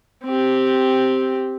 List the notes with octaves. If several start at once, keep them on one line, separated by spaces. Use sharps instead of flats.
C4 G4